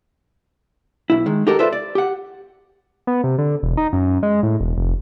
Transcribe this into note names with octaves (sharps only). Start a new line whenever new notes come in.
B1 E4
D#3 G#3
D#4 F#4 G4 A4 A#4
F4 A4 B4 C5 D5 E5
D5
G4 F#5
B3
C3
D3
E1
D#4
F#2
G#3
A2
E1
F1